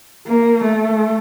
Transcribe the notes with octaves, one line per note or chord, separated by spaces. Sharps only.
A#3
A3